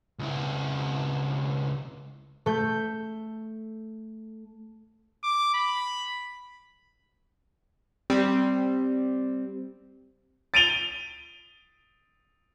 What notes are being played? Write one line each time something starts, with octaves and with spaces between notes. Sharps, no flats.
C#2 E4
A3 G6
D6
B5
G3 C4
A6 D7 D#7 F7 G7